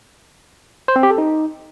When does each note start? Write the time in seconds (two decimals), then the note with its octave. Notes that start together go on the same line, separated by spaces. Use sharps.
0.88 C5
0.96 C4
1.03 G4
1.11 A4
1.18 D#4